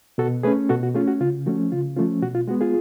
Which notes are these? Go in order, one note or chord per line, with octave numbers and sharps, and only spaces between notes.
B2 F#4 A4
A3 C#4 G#4 B4
B2 F#4 A4
F#4
A3 C#4 F4 G#4
F#4
C#3 F4
F3 A3 C#4 F#4
C#3 F4
F3 A3 C#4 F4
B2 F#4
F4
G#3 B3 F#4
F4 G#4